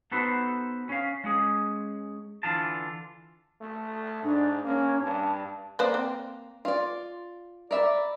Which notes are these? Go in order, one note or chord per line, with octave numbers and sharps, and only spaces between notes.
B3 D#4 F#4 A4 B4 C5
C#4 F5
G#3 C#4 G#4
D3 E3 D4 F4 A5
A3
G#2 D4
A#3 C#4
G2 A5
A#3 B4 C5 D5
C4
F4 D5
A#4 D5 E5 B5